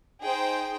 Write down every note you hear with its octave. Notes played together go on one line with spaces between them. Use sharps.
D#4 G#4 C5 G5